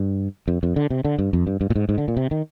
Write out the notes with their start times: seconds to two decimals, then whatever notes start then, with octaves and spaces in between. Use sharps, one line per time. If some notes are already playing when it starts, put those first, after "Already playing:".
Already playing: G2
0.48 F2
0.63 F2
0.76 D3
0.90 C3
1.05 D3
1.18 G2
1.33 F2
1.47 G2
1.61 G2
1.70 A#2
1.76 G#2
1.89 G#2
1.98 D3
2.08 A#2
2.17 C3
2.31 D#3